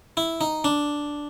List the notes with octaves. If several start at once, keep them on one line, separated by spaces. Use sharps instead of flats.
E4
D#4
D4